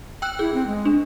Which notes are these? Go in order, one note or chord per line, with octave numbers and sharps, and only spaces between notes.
G5 E6 F#6
E4 G#4
C4
G#3
D4